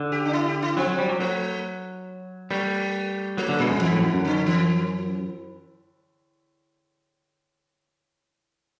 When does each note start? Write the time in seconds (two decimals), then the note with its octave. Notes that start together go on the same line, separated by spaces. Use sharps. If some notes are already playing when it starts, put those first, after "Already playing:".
Already playing: D3
0.12 G4
0.25 D4
0.33 E4
0.48 G4
0.62 E4
0.77 F#3 C4
0.88 F#3
0.98 G3
1.09 F#3
1.20 F#3 A3
2.50 G3 A3
3.37 F#3 A3
3.49 D3
3.60 B2 G3
3.70 F#2
3.81 F#2 E3
3.92 A2
4.03 F#2
4.14 F#2
4.25 D3
4.46 E3